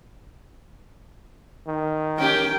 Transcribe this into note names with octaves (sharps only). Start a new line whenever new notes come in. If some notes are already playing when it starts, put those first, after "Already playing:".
D#3
A#3 C#4 G4 A#4 G5